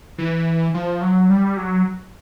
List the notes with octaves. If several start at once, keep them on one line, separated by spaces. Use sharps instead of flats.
E3
F3
F#3
G3
F#3